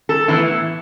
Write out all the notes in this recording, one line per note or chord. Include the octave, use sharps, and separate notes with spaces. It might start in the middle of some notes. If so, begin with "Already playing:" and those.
A4
A2 E3 B3 E4